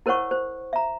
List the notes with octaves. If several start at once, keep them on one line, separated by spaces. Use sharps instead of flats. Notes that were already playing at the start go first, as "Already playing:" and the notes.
E4 A#4 C5 C#5 F#5 C#6
C5
E5 A#5